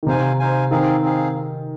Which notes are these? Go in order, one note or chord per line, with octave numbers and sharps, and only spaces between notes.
D#3
C3 D#4 C5 F5 G#5
D#4 C5 F5 G#5
D#3 C4 D#4 G#4 F5
C4 D#4 G#4 F5